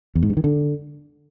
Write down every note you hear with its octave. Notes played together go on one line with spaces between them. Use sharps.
E2
G#2
G2
D#3
D3